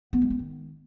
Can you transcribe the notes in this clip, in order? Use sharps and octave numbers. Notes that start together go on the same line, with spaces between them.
B3
G#3
C#4
D#3